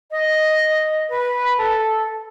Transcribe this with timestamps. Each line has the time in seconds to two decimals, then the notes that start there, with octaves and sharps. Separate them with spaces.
0.11 D#5
1.09 B4
1.58 A4